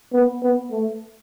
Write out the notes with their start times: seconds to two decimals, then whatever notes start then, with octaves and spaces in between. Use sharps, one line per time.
0.13 B3
0.42 B3
0.71 A3